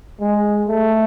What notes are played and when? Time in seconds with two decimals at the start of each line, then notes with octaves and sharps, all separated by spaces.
0.21 G#3
0.68 A3